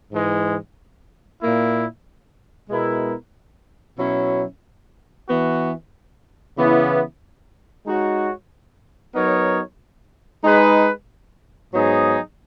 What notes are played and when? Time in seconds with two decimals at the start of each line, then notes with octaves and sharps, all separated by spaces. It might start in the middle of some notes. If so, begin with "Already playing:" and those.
0.11 G#2 E3 G#3
1.40 A#2 A#3 E4
2.69 B2 G#3 B3 E4 A#4
3.98 B2 F#3 C#4 E4
5.27 E3 B3 F#4
6.56 C#3 E3 B3 E4
7.86 G#3 D#4 F#4 C#5
9.15 F#3 B3 D#4 A#4 C#5
10.44 G#3 D#4 G#4 B4
11.73 G#2 F#3 B3 D#4 G#4